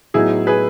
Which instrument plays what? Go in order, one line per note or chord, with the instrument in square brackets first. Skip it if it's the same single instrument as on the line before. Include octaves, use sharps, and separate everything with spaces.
[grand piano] A2 F#3 B3 D#4 F#4 [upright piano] E4 G#4
[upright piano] G#4 B4